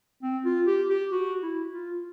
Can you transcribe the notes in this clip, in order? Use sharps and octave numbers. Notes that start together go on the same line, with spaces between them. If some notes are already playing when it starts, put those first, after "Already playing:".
C4
F4
G4
G4
F#4
E4
F4